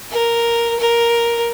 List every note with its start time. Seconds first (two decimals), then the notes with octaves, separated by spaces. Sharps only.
0.11 A#4
0.79 A#4